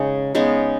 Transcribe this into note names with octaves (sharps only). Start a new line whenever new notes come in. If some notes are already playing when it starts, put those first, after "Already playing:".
Already playing: C#3 G#3 D#4
C#3 G#3 B3 D#4